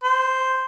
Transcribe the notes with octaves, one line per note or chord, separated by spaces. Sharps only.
C5